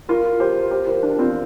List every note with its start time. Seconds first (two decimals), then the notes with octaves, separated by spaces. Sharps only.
0.09 F4 A#4
0.40 G4 C5
0.71 G4 C5
0.87 F4 A#4
1.03 D4 G4
1.19 C4 F4